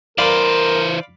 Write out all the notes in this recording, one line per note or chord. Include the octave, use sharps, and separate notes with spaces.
E3 A#4 C5 D5 F5 B5